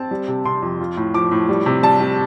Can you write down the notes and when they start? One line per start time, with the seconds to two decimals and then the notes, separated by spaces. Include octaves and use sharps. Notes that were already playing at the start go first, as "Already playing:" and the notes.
Already playing: C4 A5
0.11 G3
0.28 C3
0.45 C3 C6
0.62 F2
0.80 F4
0.97 A2
1.14 F3 D6
1.32 A2
1.49 G3
1.66 C3
1.83 G3 A5
2.00 G3